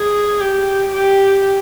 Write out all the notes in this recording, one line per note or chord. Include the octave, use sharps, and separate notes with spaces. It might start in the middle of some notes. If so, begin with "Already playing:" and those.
Already playing: G#4
G4
G4